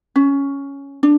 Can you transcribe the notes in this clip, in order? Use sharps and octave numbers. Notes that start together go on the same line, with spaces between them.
C#4
D4